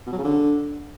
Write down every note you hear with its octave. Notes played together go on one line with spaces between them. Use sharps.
B2
F#3
C#3
D3